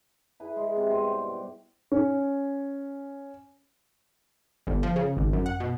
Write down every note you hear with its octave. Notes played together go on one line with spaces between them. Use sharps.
E4 G#4 B4
G#3
C3 C4
G2 B2 C4 G#5
G5
G4
C#4
G1
F3
C#3
G#1
F#2
F#5
B2